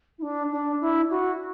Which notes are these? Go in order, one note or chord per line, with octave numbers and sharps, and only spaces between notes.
E4
D4
D4
E4
F#4